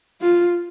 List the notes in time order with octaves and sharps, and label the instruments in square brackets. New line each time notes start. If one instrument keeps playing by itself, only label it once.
[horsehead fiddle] F4